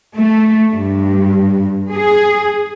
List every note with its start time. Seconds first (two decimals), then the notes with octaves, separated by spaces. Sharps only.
0.17 A3
0.72 G2
1.92 G#4